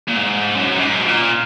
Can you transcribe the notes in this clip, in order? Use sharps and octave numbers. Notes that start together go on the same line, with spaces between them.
A#2
G#2
F#2
G#2
B2
A#2